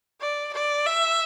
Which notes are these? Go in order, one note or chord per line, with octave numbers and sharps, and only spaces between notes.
D5
D5
E5